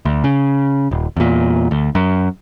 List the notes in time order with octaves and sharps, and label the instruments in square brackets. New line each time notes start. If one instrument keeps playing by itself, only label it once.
[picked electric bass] D2
C#3
D#1
E2 A#2
D2
F#2